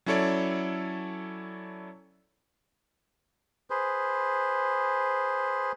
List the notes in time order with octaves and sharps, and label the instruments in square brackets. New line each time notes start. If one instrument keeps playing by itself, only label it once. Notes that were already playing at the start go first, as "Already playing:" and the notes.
[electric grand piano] F#3 C#4 E4 A4 C#5 D5
[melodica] G#4 B4 C5